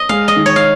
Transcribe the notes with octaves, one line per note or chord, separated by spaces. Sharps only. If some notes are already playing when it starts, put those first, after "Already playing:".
Already playing: D#5
G#3 F5
D#5
D#3
C#5
F5